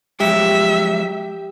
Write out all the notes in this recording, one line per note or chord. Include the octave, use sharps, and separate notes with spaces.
F3 F#3 G#3 G4 E5